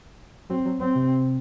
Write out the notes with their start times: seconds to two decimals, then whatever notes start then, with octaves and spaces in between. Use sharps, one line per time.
0.49 F#3 C4
0.65 F#3
0.80 F#3 C4
0.95 C3